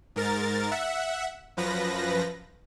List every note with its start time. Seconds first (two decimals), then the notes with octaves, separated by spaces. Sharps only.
0.16 G#2 A#4 A6
0.71 E5 F#5
1.57 F#2 F3 B4 A#6